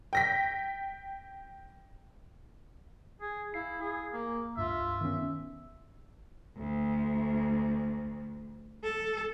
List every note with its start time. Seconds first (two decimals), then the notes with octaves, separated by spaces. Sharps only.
0.13 G5 A#6 B6
3.21 G#4
3.54 E4 F5 C7
3.80 G#4
4.12 A#3
4.57 C#2 G2 F4 E5
5.01 D#3 B3 C#4
6.58 D2
8.83 A4